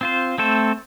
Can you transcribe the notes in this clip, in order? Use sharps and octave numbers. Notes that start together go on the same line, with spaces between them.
C4 F4 C5
A3 C4 A4 C5